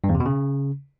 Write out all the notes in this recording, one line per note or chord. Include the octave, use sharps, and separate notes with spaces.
G2
E2
C3
B2
C#3